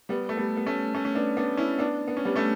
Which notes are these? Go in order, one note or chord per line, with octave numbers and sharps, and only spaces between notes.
G3 B3
A3
G3 B3
B3
A3 C#4
A3 C#4
C#4
B3 D4
B3 D4
C#4 E4
B3 D4
B3
C#4
G3 B3
A3 C#4